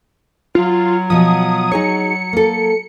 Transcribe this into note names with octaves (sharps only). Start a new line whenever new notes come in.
F#3 F4
B2 F3 D#6
D#4 G#4 C#5 C#7
A#3 A4